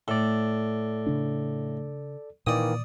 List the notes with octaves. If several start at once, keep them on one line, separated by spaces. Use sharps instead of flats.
A2 A4 D5
C#3 D4
A#2 D#3 E3 A#3 D5 D#6